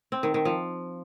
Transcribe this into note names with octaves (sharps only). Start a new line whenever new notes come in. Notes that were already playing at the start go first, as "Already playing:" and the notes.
C4
D#3
D#3
F3